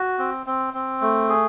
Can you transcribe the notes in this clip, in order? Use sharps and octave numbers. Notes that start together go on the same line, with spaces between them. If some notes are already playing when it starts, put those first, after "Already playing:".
Already playing: F#4
C4
C4
C4
A3
G#4